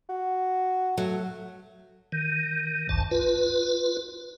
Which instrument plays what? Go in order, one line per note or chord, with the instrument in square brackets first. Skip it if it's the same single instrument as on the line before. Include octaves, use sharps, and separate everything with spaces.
[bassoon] F#4
[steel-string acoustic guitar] F#3 [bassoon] A3
[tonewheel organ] D#3
G#1 C#2 G2 A5
F4 B4